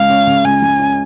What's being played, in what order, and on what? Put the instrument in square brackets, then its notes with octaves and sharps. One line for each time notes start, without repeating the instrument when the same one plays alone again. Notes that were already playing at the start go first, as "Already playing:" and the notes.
Already playing: [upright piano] C#2 C#3 G#3 [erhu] F5
[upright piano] C#4
C#3
[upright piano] C#2 [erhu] G#5
[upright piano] G#3
C#4